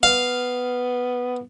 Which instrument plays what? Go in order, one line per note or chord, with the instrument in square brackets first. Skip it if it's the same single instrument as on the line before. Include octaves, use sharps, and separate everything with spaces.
[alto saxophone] B3 [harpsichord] F5